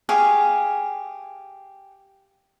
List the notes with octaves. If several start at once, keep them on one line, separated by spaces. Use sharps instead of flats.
G4 G#4 F5 C#6